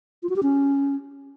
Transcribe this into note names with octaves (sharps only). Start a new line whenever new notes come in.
F4
F#4
G4
C#4